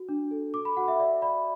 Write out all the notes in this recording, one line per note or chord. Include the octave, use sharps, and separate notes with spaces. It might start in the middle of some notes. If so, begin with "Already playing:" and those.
Already playing: F#4
D4
A4
A4 D6
B5
F#4 F#5
E5
D5 E5
D5 B5